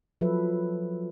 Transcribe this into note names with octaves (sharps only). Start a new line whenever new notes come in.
F3 F#3 A4 B4 E5